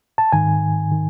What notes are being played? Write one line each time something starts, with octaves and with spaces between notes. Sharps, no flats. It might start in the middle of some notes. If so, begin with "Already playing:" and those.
A5
G#2 D#3 G#5
D#3